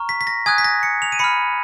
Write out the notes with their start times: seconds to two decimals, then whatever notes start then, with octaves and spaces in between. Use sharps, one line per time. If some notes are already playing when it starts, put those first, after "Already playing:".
Already playing: A#5 C#6 F6
0.09 B6
0.21 B6
0.27 A#6
0.46 G#5 D#6 F#6 G#6
0.58 B6
0.64 A#6
0.83 C#7
1.02 F7
1.12 D#7
1.19 B5 F6 C#7